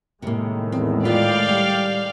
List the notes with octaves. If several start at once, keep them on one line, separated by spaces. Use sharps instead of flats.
A2 C3 D#3 G#3 A#3
E2 C4
F4 B4 D5 F5 G5
G3 F#5